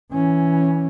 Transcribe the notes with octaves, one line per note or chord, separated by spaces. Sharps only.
E3 C#4